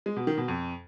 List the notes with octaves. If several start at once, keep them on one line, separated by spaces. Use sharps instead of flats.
G#3
B2
D#3
B2
F2